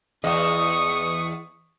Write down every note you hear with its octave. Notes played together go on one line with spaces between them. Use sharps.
E2 D#5 C#6 D#6